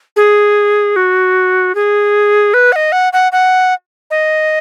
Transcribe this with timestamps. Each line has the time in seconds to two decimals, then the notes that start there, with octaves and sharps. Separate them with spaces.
0.16 G#4
0.96 F#4
1.75 G#4
2.54 B4
2.72 F#5
2.76 D#5
2.92 F#5
3.13 F#5
3.32 F#5
4.11 D#5